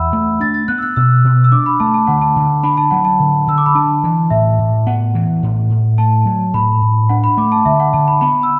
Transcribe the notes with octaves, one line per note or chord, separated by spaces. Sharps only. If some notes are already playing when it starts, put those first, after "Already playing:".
Already playing: E2 E5 F#5 B5 E6
A3
D4 A6
A6
B3 F#6
E6
F#6
B2 E6
B2
E6
D4 D6
B5
A3 A5
A5
D3 F#5
A5
D3
D4 B5
A5
F#3 F#5
A5
D3
D3 E6
D6
B5
D4 A5
E3
A2 E5
A2
B3 F#5
E3
A2
A2
A3 A5
F#3
A2 B5
A2
D4 F#5
B5
A3 D6
A5
D3 E5
F#5
D3 A5
B5
B3 B5
E6